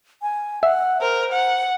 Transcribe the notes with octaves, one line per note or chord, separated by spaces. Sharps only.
G#5
E5 F#5
A#4 C5
F#5